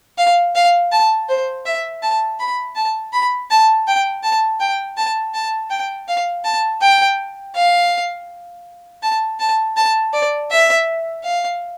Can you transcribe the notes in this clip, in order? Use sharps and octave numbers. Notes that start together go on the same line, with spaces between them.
F5
F5
A5
C5
E5
A5
B5
A5
B5
A5
G5
A5
G5
A5
A5
G5
F5
A5
G5
F5
A5
A5
A5
D5
E5
F5